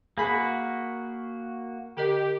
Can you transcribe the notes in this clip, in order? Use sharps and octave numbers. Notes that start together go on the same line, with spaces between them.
A#3 F#4 G#4 B5
D3 G4 A#4 D#5